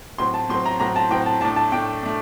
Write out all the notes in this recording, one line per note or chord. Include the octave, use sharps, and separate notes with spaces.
A2 F#3 C4 C6
A5
A2 F#3 C4 C6
A#5
A2 F#3 C4 A#5
A5
A2 F#3 C4 G5
A5
A2 A3 D4 A5
A5
A2 A3 D4 G5
A3 D4